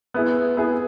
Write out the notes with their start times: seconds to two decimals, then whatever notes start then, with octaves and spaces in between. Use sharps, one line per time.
0.14 B3 E4 G#4
0.57 B3 E4 G#4